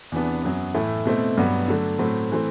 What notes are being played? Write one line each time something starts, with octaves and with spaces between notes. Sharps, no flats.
E2 C3 E3 B3 D4
F#2 F#3 B3
A2 E3 A3 E4
B2 A3 C4 E4
G2 F#3 B3
D3 F#3 A3 D4
A2 F#3 A3 C4
E3 A3 C4